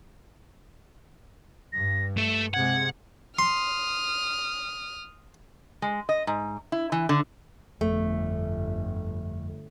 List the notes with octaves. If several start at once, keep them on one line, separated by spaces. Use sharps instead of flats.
G2 A#6
A3 A4 E7
C3 G#3 F#5 G#6
C6 D#6 F6
G#3
D#5
G#2
E4
E3
D3
G1 F2 A3